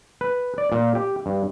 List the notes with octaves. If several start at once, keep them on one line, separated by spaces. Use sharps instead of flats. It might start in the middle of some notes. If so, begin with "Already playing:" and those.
B4
D5
A#2
G4
G2